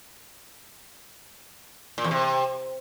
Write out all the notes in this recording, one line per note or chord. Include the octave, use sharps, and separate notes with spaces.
A#2
E2
C3